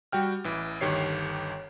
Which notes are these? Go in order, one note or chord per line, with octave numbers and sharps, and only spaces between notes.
G3 F#4 G5 F6
A1 E3
G1 D2 D#3 G4 C#5 C7